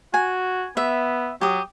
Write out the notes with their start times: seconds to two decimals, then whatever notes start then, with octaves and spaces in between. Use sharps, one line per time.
0.14 F#4 G#5
0.77 B3 E5
1.41 F#3 G4 D#6